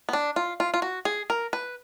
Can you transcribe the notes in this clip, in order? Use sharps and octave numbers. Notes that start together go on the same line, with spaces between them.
B3
D4
F4
F4
F4
F#4
G#4
A#4
B4